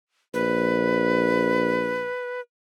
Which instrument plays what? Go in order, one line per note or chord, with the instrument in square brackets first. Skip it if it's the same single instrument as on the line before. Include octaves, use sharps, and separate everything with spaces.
[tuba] A#1 [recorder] B4